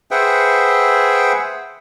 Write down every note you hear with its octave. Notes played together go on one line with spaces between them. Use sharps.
G#4 B4 C5 E5 F#5 G5